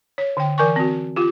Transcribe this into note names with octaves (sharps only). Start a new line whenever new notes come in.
C#5
D3 G5
E3 A#4 G#5 C#6
C4 F#4
F4 G4